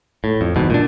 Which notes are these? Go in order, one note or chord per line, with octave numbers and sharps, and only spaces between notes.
A2
F2
G1 E2 G#2 B2
A#2 D4